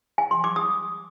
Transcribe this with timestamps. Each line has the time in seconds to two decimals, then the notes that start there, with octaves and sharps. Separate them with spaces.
0.18 G#5
0.31 C6
0.44 D6
0.56 D#6